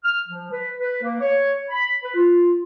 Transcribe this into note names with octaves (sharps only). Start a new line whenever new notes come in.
F6
F3
B4
B4
A#3
C#5
B5
B4
F4